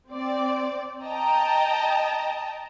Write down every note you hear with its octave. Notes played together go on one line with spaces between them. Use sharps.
C4 D5
D#5 G5 A5 A#5